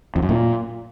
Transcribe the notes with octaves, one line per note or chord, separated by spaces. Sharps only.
F2
F#2
A#2